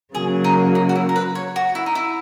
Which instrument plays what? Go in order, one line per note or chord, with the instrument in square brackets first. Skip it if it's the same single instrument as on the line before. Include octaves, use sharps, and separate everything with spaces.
[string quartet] C#3 F#3 A#3 [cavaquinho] G#4
[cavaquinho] D#4
D#4
F#4
E4
A#4
B4
C#5
F#4
E4
D#4
E4